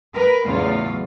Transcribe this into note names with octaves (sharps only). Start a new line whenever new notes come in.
A#4 B4
E2 A2 C#3 F#3 F4 F5